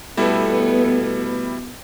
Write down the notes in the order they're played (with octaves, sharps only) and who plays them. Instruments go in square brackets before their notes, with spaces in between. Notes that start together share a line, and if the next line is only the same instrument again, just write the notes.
[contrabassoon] B2 [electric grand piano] G3 E4 [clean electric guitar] A3 A4 [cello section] B3